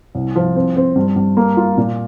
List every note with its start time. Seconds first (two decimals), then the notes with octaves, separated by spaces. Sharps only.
0.15 C2
0.36 F3
0.56 C4
0.76 C4
0.96 G2
1.16 G2
1.37 A#3
1.57 F4
1.77 A#2